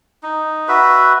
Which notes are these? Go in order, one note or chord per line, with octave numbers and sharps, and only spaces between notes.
D#4
F#4 B4 E5